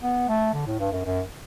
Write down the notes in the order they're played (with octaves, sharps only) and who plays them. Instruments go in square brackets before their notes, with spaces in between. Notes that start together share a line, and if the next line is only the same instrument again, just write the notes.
[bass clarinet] B3
A3
D3
A2
G2
F#2
F#2